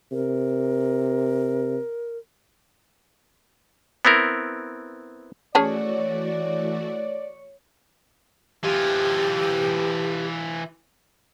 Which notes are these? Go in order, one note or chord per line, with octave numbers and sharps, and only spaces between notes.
C3 A#4
B3 C4 E4 A#4
E3 A3 C#4 F#4 G#4 C#5 D5 A5
E3 F4 G4